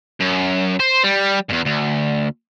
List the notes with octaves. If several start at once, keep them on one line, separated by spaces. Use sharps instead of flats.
F#2
C5
G3
E2 G2
D2